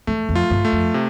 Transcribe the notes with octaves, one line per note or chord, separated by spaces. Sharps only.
E2 A3
F2
F4
G2
A3
F2
C3